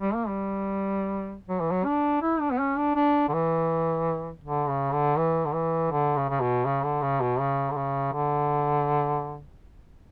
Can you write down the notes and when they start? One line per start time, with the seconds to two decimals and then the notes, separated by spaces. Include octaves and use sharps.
0.01 G3
0.15 A#3
0.28 G3
1.48 F#3
1.60 E3
1.71 F#3
1.85 D4
2.22 E4
2.40 D4
2.52 B3
2.60 C#4
2.78 D4
2.96 D4
3.29 D3
3.33 E3
4.44 D3
4.68 C#3
4.93 D3
5.18 E3
5.46 D3
5.54 E3
5.91 D3
6.16 C#3
6.29 C#3
6.41 B2
6.66 C#3
6.84 D3
7.02 C#3
7.21 B2
7.40 C#3
7.71 D3
7.76 C#3
8.13 D3